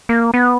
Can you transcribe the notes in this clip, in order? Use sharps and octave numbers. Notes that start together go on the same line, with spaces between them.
A#3
B3